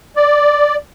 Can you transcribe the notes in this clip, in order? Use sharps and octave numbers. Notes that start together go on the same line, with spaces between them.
D5